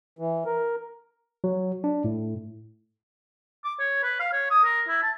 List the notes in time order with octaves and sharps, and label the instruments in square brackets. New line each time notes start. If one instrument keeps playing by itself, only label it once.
[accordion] E3
A#4
[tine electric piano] F#3
D4
A2
[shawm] D6
C#5
B4
F5
C#5
D#6
A#4
E4
A5